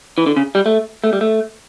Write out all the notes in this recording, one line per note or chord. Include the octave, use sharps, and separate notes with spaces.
E3
D3
C#3
G3
A3
A3
G3
A3